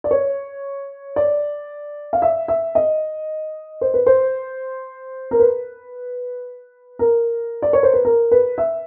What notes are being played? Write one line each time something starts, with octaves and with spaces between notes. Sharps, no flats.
D5
C#5
D5
F5
E5
E5
D#5
C5
B4
C5
A#4
B4
A#4
D5
C#5
C5
B4
A#4
B4
E5